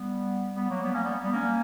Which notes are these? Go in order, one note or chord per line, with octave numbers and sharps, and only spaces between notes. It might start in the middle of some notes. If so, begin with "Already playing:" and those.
Already playing: G3 B3
G3 B3
F#3 A#3
G3 B3
A#3 C#4
G3 B3
G3 B3
A#3 C#4